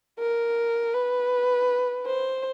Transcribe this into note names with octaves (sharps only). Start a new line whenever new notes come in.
A#4
B4
C5